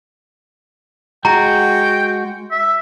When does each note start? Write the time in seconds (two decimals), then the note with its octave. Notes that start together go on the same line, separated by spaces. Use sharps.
1.25 G#3 F#4 G5 A#5
2.51 E5